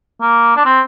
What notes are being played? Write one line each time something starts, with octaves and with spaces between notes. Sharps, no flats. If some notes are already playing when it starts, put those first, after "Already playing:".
A#3
D4
C4